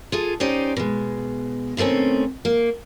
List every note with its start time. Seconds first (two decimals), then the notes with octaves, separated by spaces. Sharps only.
0.12 F4 G#4 A4
0.40 C#4 D#4 G4 C5 D5
0.77 B2 G#3
1.77 B2 D#3 A3 C4 C#4
2.45 A#3